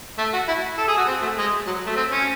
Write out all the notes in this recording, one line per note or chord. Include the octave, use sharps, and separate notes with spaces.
A3
F#4
E4
A4
G#4
F#4
C4
A3
G#3
F#3
A3
C4
C#4